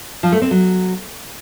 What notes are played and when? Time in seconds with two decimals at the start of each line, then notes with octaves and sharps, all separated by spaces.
0.23 F3
0.32 A3
0.42 C4
0.51 F#3